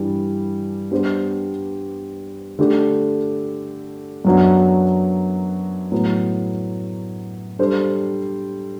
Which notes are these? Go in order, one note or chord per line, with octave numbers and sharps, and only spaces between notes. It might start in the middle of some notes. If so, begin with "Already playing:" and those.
Already playing: G2 E3 G3 D4
G3 B3 D4 G4 C5
D3 A3 D4 G4
F#2 F#3 B3 D4 F#4
A2 F#3 B3
G3 D4 A4 C5